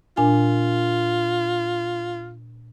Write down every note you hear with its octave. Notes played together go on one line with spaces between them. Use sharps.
A#2 D4 F4 G#5